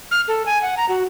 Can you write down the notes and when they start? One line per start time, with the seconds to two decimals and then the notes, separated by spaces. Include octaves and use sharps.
0.11 F6
0.28 A4
0.46 G#5
0.62 F#5
0.77 A#5
0.89 F#4